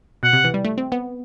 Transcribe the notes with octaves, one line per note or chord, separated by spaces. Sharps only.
B2 F#5
C3
E3
G3
A3
C4
B3